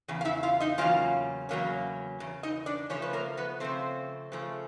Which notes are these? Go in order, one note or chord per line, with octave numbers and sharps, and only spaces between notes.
E2 C#3
F5
E4 E5
F4 F5
D#4 D#5
E2 C#3 F#3 A#3 C#4 F4 F5
E2 C#3 F#3 A#3 C#4
E2 C#3
D#4 D#5
D4 D5
C#3 F3 A3 C#4 C#5
B4
A#3 A#4
B3 B4
C#3 F3 A3 C4 C5
C#3 F3 A3